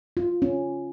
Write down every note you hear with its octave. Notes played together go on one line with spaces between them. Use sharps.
F4
C#4